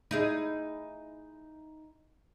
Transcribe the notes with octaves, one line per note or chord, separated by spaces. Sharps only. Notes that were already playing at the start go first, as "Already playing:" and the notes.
D#4 E4 G#4